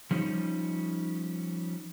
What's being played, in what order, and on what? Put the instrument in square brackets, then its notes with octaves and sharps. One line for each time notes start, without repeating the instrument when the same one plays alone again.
[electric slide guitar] F3 G3 C#4 D#4